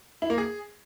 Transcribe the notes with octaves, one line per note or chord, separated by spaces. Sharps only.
E4
A#3
G#4